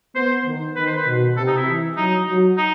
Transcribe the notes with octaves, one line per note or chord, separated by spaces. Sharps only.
B3 C5
D#3
D#3 B4
C5
B4
B2
C3 A4
D#4
E4
E3
F#3 D#4
F#3
D#4